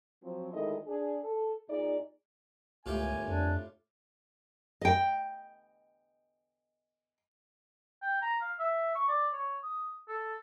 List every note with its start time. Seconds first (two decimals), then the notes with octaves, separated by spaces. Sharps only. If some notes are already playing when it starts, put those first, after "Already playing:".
0.22 F3 F#3 C4
0.53 D2 D#3 G#3 E4 A4 D#5
0.87 D4 G#4
1.23 A4
1.69 A#2 D#4 G#4 D5 D#5
2.86 G1 C#2 A2 F4 G4 A#4 G#5
3.28 F2 D4
4.81 D#5 G5
8.02 G5
8.22 A#5
8.41 F5
8.59 E5
8.95 C#6
9.08 D5
9.33 C#5
9.63 D#6
10.08 A4